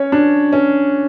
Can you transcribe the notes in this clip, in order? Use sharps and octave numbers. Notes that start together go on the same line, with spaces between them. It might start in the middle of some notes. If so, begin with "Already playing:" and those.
Already playing: C#4 C#5
D4
C#4